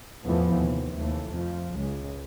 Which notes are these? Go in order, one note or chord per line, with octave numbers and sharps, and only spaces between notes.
E2 A2 E3 F3 A3 B3
D#2 C3
D#2 E3 A3
F2 F3
C#2 G#3